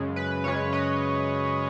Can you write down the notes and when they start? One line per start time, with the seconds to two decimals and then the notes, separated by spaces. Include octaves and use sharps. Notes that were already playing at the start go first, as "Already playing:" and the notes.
Already playing: F#2 C#3 G#3
0.16 B4
0.44 F#2 C#3 G#3 C#5
0.73 B4 D#5